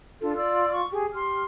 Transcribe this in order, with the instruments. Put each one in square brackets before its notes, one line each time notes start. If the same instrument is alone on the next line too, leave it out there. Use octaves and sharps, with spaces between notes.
[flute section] D4 A4 [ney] F4
[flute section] D5 E6
C#6
[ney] G4 [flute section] G#4
[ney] G4 [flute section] C6 F6